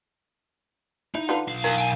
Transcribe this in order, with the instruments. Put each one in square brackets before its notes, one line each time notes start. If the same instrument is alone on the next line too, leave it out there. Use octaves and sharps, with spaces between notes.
[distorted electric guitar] D#4 [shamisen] E4
[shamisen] D3 F4 B4
[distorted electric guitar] B1 F5
[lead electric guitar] E2 [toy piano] D#4 A#4
[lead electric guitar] G5 G#5